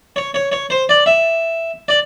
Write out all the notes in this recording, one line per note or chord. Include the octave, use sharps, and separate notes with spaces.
C#5
C#5
C#5
C5
D5
E5
D5